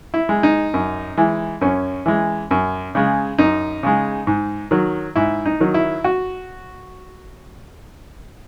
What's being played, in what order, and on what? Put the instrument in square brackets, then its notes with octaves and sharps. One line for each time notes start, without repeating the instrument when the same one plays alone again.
[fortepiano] E4
G#3
D#4
F#2
E3 G#3
F#2 C#4
E3 G#3
F#2
C#3 G#3
F#2 D#4
C#3 G#3
G#2
D#3 F#3
G#2 E4
D#4
D#3 F#3
E4
F#4